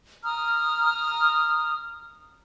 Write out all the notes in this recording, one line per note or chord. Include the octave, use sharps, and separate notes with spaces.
A#5 D#6 F6